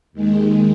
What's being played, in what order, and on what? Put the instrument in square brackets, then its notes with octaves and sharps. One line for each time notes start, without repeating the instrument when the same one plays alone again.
[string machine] D#2 D#3 G#3